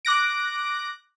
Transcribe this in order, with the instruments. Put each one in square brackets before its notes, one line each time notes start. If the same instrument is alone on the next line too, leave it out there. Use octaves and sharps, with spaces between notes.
[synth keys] D6 F#6 A#6 D7